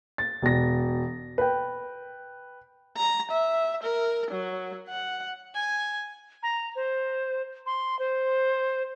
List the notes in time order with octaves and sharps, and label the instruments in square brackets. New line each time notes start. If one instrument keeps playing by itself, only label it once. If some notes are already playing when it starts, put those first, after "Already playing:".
[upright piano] A6
E1 A#6
B4 G5
[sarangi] A#5
E5
A#4
F#3
F#5
[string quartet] G#5
[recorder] A#5
C5
C6
C5